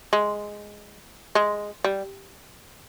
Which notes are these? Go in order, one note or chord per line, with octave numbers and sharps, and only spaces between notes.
G#3
G#3
G3